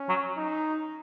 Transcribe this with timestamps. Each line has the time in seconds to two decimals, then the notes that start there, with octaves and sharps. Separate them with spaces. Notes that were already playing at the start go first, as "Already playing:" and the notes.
Already playing: C#4
0.09 F#3
0.37 D#4